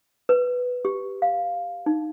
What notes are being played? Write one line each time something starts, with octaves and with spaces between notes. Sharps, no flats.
B4
G4
F5
D#4